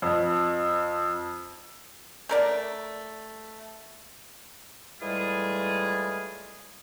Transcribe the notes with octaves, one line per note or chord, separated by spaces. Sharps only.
F2
A3 A#4 D5
A2 E3 G3 G#3 F4 G#4